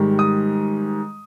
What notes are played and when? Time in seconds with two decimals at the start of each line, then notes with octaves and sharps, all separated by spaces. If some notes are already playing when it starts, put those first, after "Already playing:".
Already playing: G#2 D#3 G3
0.19 D#6